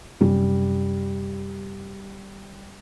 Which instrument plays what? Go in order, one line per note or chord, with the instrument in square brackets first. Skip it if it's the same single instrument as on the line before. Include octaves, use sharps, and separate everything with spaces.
[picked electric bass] F#2 C3 C#4 [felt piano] G3